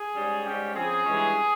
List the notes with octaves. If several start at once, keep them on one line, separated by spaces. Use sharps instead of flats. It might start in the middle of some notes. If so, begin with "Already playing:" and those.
Already playing: G#4
G#2 G3 C#4
G#2 G3 C#4 G4
C#3 F3 C4 G#4
G2 E3 G#3 C#4